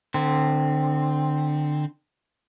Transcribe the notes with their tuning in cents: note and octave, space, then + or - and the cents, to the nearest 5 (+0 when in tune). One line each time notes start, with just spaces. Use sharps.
D3 +25 C4 +0